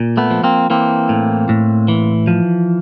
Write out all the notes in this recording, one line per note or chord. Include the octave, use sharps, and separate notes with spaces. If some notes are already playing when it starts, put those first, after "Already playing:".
Already playing: A#2
A3 B3
F3
A#3 C4
E3 A#3 C4
A2
A2
E3
F3